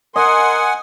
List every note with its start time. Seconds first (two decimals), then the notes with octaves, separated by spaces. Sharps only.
0.16 A#4 D#5 F#5 G#5 C6